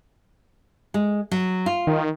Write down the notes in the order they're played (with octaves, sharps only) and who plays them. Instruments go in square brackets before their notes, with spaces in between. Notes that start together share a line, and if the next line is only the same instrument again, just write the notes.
[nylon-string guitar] G#3
F#3
F4
[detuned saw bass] D#3